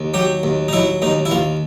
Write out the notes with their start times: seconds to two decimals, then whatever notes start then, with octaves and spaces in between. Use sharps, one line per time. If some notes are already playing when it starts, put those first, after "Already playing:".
Already playing: D#2
0.14 F#3 G4
0.43 D#2
0.68 D#4
0.73 F#3 E4
1.02 D#2 D#4
1.25 E4
1.31 D#2 F4